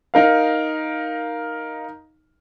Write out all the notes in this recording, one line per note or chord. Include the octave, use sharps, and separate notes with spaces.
D#4 A#4 F5